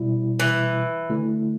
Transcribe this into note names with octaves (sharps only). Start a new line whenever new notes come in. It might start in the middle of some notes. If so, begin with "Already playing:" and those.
Already playing: B2 G3 E4
E3
D3 A3 E4